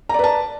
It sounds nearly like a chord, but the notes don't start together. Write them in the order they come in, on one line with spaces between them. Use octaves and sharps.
A#5 D5 B4 A5